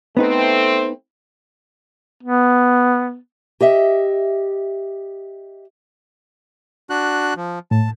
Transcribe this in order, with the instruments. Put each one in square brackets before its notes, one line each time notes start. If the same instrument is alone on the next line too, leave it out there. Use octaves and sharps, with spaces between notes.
[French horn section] A3 C4 [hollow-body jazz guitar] B3 D#4 B4
[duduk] B3
[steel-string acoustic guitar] G4 D#5 E5
[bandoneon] D4 F#4 F#6
F3
[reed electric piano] A2 [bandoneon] A5